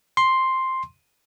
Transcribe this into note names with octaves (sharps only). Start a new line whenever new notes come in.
C6